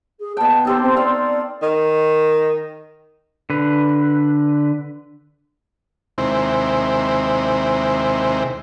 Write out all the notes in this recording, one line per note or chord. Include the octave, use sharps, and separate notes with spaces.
G#4
B2 G5 A5
D#4 G4 A4 C5
C4
C4 D5 F5
D#3
D3 B4
D#2 C3 G#3 C4 E4